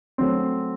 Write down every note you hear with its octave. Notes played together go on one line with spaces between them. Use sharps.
F#3 A3 C4